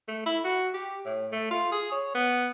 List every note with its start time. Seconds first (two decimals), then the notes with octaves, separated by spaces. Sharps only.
0.08 A3
0.26 E4
0.45 F#4
0.74 G4
1.05 A2
1.32 A3
1.51 F4
1.72 G#4
1.92 C#5
2.15 B3